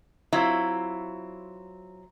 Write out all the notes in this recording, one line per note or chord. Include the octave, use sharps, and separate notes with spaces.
F#3 C4 E4 F4